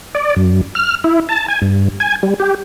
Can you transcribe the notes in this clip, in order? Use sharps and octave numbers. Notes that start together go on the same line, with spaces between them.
D5
F#2
F6
E4
A5
G#5
G2
G#5
G3
G4